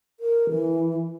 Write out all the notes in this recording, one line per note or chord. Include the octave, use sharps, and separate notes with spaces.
A#4
E3